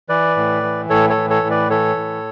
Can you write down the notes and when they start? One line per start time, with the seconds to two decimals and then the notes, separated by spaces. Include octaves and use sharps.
0.09 E3 B4 D5
0.37 A2
0.63 E3
0.90 A2 A4 C#5
1.10 A4 C#5
1.16 E3
1.30 A4 C#5
1.44 A2
1.50 B4 D5
1.70 E3 A4 C#5
1.97 A2